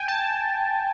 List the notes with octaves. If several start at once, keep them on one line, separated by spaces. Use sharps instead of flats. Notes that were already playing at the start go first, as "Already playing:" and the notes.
Already playing: G5 G#5
A5